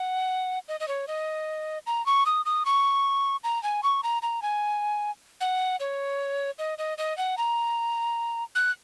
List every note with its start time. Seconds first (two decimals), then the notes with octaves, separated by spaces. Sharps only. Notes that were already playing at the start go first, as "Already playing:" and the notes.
Already playing: F#5
0.68 D#5
0.80 D#5
0.88 C#5
1.08 D#5
1.86 A#5
2.06 C#6
2.26 D#6
2.45 D#6
2.65 C#6
3.44 A#5
3.63 G#5
3.83 C#6
4.03 A#5
4.22 A#5
4.42 G#5
5.41 F#5
5.80 C#5
6.58 D#5
6.78 D#5
6.98 D#5
7.18 F#5
7.38 A#5
8.55 F#6